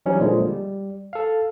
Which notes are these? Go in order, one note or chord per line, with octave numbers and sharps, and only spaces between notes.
E3 F#3 G3 C#4 D#4 E4
A#2 D3 F3 G#3 A#3
G3
A4 F5